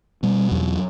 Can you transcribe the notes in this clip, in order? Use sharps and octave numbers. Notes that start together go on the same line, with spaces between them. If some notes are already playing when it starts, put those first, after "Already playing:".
B2 G3
E2 F#3